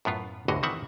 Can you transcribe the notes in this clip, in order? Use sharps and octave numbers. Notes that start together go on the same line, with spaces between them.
F#2 A2 B3 F4
G1 D2 A2 D3 F#4 D#5
D#3 E3 C4 E5 F#5